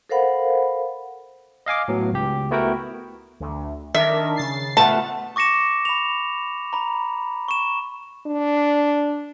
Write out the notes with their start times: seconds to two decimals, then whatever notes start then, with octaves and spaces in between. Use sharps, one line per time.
0.09 A4 A#4 C5 F5 F#5 B5
1.66 D#5 F5 G#5 D6
1.88 A2 F#3 B3
2.13 C#2 G4
2.51 A3 B3 E4 F#4 A#4 G5
3.40 D2
3.95 D#3 D4 A#4 E5
4.36 C#3 A6 C7
4.77 A3 B3 F4 B4 A5
5.36 C#6 D6 A#6 C#7 E7
5.85 B5 F7
6.73 A#5 B5
7.48 C#6 E7
8.27 D4